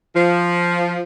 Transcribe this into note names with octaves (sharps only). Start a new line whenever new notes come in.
F3